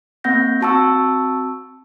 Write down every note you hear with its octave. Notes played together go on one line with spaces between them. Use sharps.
A#3 C4 F#5 G6 A#6
C4 F#4 A5 C#6 E6